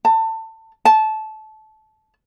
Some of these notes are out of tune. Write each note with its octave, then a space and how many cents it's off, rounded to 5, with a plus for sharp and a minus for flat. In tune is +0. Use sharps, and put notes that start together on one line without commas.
A5 +25
A5 -20